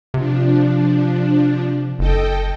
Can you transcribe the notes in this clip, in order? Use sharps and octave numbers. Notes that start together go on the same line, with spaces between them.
C3 F3 D4
F#1 A4 D#5 G5